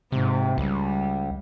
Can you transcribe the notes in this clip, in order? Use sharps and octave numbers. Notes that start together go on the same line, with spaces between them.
G#2 C3
C#2 G3